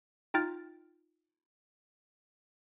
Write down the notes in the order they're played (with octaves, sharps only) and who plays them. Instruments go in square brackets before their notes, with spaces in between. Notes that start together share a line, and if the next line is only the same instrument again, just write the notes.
[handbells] D#4 F4 G5 F6 A6